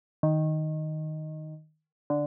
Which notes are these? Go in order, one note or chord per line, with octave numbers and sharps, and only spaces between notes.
D#3
D3